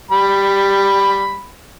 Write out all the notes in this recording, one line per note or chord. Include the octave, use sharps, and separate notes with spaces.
G3 B5